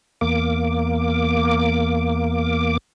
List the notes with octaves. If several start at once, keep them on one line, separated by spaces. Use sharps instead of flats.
E2 A#3 D6